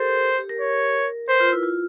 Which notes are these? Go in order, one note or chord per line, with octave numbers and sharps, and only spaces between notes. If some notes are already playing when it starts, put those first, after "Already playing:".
Already playing: G4 A4 A#4 C5
G4
A#4
C#5
B4 C5
F4
E4
F4